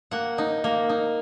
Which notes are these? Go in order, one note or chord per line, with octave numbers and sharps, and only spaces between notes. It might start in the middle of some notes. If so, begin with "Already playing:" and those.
A#3 F#5
D#4
A#3
D#4